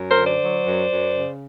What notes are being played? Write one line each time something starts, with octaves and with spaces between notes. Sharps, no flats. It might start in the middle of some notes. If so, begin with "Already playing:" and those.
Already playing: F#2
A#4 C5
D3
C5 D5
F#3
F#2
F#2
C#3